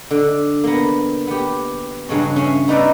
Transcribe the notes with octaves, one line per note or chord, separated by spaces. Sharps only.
D3
A#3 B3
B3 G4
G2 C#3 F#3 C#4
C#4 E5 F5
B3 D#4 B4 D5 E5